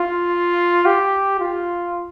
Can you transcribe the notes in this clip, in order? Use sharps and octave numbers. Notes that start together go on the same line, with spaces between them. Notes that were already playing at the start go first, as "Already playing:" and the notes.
Already playing: F4
G4
F4